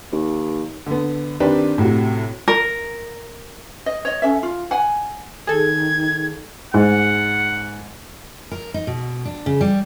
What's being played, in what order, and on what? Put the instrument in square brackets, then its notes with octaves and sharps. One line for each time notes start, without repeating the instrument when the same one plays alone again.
[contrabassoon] D#2
[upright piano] D3 B3
D#3 C4 D4 G4 B4
A2 C3 F#4
[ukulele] A#4
D#5
C#5 D#5
C#4 A4 E5
F4
F#5 G#5
[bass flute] D#3 [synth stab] G#4 A4 [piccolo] G#6
[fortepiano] G#2 [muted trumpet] F#5
[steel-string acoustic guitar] A#4
D#4
B2
D4
C#3
G3